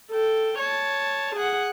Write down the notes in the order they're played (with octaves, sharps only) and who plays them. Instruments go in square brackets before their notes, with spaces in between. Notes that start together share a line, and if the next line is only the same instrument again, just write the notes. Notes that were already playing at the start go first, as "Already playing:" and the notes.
[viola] A4 G5
C#5 A5
G#4 F#5